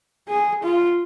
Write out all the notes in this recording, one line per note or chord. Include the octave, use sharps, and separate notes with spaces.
G#4
F4